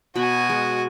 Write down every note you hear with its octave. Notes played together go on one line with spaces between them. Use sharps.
B2 F#4 B4 G#5 B5
G#3